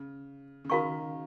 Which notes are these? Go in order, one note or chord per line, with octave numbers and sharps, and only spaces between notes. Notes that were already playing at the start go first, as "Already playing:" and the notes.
Already playing: C#3
C#3
D#3 F#4 A#4 F5 A#5 C#6